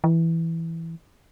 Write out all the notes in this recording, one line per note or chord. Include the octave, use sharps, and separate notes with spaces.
E3